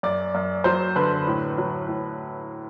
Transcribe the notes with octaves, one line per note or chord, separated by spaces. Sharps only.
F#2 D5
F#2
F#3 C5
D3 B4
A2
F#3
A2